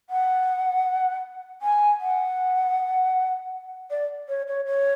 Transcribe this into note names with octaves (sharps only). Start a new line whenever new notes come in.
F#5
G#5
F#5
D5
C#5
C#5
C#5